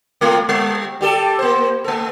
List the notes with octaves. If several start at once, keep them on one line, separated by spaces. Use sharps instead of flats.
G#3 A3 F4
G3
G3 G4 A4
A#3 C5
A3 A4